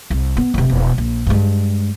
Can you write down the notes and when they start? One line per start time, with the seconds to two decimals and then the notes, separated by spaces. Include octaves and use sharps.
0.10 C2
0.37 B3
0.54 F1 C3
0.69 E1
0.98 A#1
1.27 G2 G#3